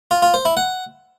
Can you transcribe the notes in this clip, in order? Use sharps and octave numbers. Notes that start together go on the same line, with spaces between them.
F4
F4
C5
E4
F#5